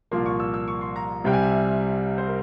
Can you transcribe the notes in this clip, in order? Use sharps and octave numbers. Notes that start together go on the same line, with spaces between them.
C2 A#2 F3 A#3 C6
C#6
E6
E6
C#6
C6
A#5
C2 C3 G3 G5
G#5
E5
C5
A#4